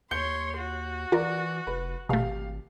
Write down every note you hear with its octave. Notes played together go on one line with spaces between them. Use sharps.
D#2 C#5 C6 G6 C#7 G7
F#4
E3 F4 A#4 D5
F1 B4
G#1 B2 A3 G4 F5